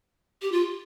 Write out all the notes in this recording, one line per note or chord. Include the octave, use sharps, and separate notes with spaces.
G4
F4